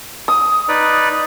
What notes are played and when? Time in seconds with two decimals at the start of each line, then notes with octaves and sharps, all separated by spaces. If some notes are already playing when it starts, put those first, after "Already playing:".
0.28 D#6
0.69 D#4 B4 D5